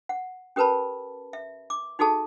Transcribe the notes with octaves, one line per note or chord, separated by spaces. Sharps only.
F#5
C#4 G4 A#4 B4 A5 B5
E5
D6
D#4 F#4 G#4 A4 A5